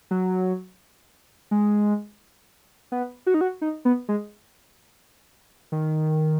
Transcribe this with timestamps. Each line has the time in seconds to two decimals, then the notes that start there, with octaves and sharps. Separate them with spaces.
0.11 F#3
1.51 G#3
2.92 B3
3.26 F#4
3.34 D#4
3.41 F#4
3.61 D#4
3.85 B3
4.09 G#3
5.72 D#3